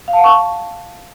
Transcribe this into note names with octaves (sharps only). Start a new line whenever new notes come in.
F5
A5
F#5
C#6